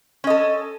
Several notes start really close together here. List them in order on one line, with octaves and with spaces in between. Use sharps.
C#4 D#5 A4